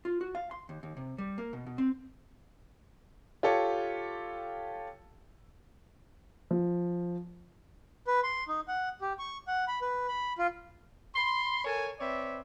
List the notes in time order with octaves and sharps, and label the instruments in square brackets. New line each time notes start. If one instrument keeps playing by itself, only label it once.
[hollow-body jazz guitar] F4
F#4
F5
C6
D#2
D#2
C3
G3
A#3
B2
B2
C4
[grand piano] F4 G4 A4 C#5
F3
[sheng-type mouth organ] B4
C6
D#4
F#5
G4
C#6
F#5
B5
B4
B5
F4
[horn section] B5 C6
A4 A#4 C#5 G#5
C4 B4 C#5 D5 E5